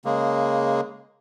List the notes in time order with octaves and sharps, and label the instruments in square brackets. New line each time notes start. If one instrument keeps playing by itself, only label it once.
[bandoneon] C#3 G#3 A#3